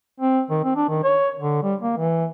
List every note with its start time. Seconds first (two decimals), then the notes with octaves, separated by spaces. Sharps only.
0.20 C4
0.50 D#3
0.64 C4
0.76 D4
0.89 D#3
1.04 C#5
1.39 D3
1.63 G3
1.81 A#3
1.97 E3